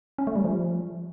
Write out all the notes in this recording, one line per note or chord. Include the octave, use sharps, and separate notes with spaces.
C#4
A3
G3
F3